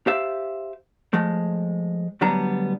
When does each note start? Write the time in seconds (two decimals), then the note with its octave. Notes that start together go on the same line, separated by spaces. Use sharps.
0.07 G4 C5 E5 F5
1.13 F3 G#3 A3
2.21 D2 F#3 G3 B3 D4 A#5